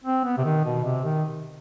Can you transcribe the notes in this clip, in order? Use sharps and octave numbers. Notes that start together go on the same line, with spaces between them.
C4
B3
C3
D#3
B2
C3
D#3